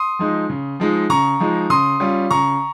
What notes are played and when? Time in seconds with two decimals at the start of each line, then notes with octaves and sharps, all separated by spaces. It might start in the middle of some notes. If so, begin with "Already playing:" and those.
Already playing: C6 D#6
0.19 F3 G#3 D#4
0.50 C#3
0.80 F3 G#3 D#4
1.09 C#3 A#5 C#6
1.40 F3 G#3 D#4
1.70 C#3 C6 D#6
2.00 G3 C#4 F4
2.31 C#3 A#5 C#6